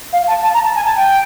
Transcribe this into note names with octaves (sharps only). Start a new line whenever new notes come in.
F5
A5
A5
A#5
A5
G#5
A5
G5